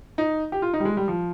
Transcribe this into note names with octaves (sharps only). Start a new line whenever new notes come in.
D#4
G4
F4
D#4
G3
G#3
G3
F3